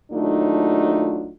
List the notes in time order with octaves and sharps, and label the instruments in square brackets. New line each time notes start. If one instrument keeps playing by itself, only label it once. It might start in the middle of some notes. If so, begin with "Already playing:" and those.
[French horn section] D#2 F#3 A3 D4 D#4 F4